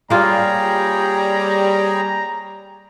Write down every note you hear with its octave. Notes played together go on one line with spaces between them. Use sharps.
G3 A#3 F4 G#4 C#5 G5 A#5